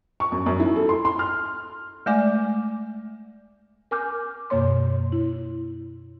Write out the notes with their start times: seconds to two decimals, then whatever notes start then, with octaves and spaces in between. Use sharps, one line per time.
0.20 C#6
0.32 F#2
0.46 F#2
0.60 E4
0.76 A4
0.89 C6
1.05 C6
1.19 F6
2.06 G#3 A3 D5 G#5 D6
3.91 A#4 G#5 D6 F6 G6
4.50 F#2 B2 A#3 C#5 C6
5.12 E4